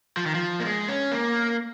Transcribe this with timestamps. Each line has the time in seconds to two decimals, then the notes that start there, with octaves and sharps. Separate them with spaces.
0.17 F3
0.26 D#3
0.34 F3
0.60 A#3
0.65 G#3
0.89 C#4
1.12 A#3